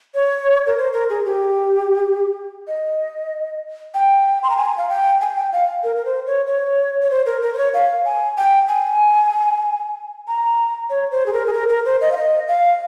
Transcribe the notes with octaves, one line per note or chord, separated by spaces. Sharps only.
C#5
A#4
C5
A#4
G#4
G4
D#5
G5
C6
A#5
G#5
F5
G5
G#5
G5
F5
A#4
A#4
C5
C#5
C#5
C#5
C5
A#4
A#4
C5
C#5
F5
G#5
G5
G#5
A#5
C#5
C5
G#4
A#4
G#4
A#4
A#4
C5
D#5
F5
D#5
F5